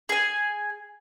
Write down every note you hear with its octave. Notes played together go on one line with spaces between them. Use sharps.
G#4 G#5